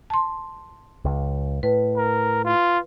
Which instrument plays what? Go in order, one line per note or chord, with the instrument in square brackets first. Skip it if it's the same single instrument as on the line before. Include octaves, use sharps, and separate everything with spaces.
[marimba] A5 C6
[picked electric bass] C#2
[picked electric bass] A2 [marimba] B4
[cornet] A#4
F4